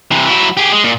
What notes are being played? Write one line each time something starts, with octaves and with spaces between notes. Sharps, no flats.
C3 E3
F#3 E4
G4 G#4
G#3
A#2